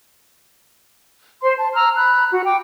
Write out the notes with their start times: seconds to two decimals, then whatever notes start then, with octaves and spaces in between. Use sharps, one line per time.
1.41 C5 C6
1.56 A5
1.74 A#5 E6 F6
1.96 B5 F#6
2.30 F#4
2.46 G5 D6